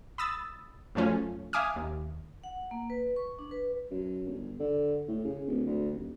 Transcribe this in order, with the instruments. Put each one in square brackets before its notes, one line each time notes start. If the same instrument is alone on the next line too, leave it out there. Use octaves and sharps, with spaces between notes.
[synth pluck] B5 D#6 E6 A6
F#2 F3 A3 C#4 F4
E5 F5 G#5 D6 D#6 F6
D#2
[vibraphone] F#5
A#3
B4
C#6
D4
B4
[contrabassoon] F#2
G1
D3
A2
C#3
D1
D2
D#1